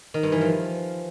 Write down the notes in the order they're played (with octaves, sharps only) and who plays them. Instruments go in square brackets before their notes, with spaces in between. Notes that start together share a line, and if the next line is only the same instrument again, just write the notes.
[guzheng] D#3
G2
E3
F3